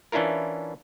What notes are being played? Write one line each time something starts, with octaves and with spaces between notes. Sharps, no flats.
E3 C#4 D4 E4 F4 A#4